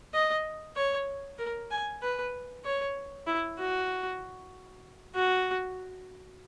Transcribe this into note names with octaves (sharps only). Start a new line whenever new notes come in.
D#5
C#5
A#4
G#5
B4
C#5
E4
F#4
F#4